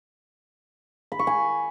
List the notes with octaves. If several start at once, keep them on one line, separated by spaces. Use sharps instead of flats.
B5
C#6
G#5